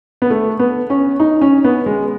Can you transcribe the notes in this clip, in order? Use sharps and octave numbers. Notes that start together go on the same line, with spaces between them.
B3
A3
B3
C#4
D#4
C#4
B3
G#3